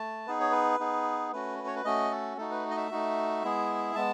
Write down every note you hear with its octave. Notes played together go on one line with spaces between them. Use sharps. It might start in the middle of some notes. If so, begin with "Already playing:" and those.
Already playing: A3 A5
B3 D#4 G#4 B4
C#5
B4
B3 D#4 G#4
A3 C#4 F#4 B4
B4
C#5
B4
A3 C#4 F#4 D#5
A4
A3 D#4 F#4 A4
B4
D#5
E5
A3 D#4 F#4
G#3 B3 E4 G#4
G#3 B3 A5